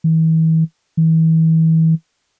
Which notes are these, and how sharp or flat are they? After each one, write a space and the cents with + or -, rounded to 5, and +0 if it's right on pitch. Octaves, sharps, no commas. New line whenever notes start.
E3 -40
E3 -35